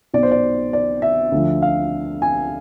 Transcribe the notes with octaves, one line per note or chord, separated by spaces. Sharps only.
B1 B2 D5
C5
D5
D5
E5
D2 D3 F3
F5
G#5